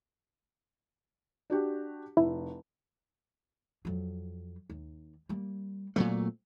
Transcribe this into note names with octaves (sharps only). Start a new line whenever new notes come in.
D4 F#4 G4
F1 E4
F2 F#3
D#2
G3 A#3
A#2 F#3 A3 C4